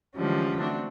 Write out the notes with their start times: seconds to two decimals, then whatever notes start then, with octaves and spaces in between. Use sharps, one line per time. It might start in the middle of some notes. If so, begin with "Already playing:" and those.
0.16 D3 E3 F3 G3 G#3 C#4
0.58 A3 C4 D4 F#4